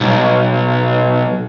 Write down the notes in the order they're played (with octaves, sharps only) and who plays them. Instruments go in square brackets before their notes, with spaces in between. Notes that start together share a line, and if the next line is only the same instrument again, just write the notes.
[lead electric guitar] B1